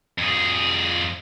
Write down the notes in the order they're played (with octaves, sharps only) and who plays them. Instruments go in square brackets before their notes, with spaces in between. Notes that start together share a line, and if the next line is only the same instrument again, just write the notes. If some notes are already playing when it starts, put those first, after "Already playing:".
[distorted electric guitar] F2 G#4